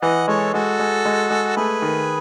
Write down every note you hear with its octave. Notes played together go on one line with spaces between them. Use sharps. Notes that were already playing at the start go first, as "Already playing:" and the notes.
E3 D#5 F#5
G#3 A4 C#5
G#3 F#4 A4
G#3
G#3
G#3
A3 G#4 B4
D#3